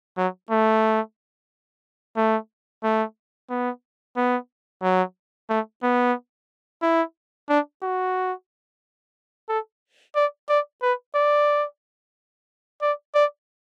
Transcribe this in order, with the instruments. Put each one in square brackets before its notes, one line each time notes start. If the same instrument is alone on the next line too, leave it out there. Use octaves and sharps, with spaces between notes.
[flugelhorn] F#3
A3
A3
A3
B3
B3
F#3
A3
B3
E4
D4
F#4
A4
D5
D5
B4
D5
D5
D5